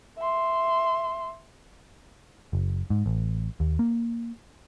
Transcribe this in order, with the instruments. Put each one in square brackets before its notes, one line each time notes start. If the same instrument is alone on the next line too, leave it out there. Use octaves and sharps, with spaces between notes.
[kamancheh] E5 C6
[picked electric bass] F#1
G#2
A1
D#2
A#3